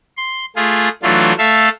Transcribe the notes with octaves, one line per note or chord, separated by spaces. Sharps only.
C6
A3 F4 G#4
E3 F#3 A3 D4 F4
A3 A4 E5 F5